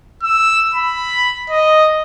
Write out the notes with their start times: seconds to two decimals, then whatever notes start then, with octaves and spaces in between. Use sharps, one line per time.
0.23 E6
0.74 B5
1.50 D#5